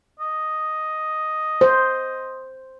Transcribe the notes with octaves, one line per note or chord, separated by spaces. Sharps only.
D#5
C5